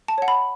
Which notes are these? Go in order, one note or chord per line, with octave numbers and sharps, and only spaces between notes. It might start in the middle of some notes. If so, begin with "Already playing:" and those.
A5
C#5 F#5
B5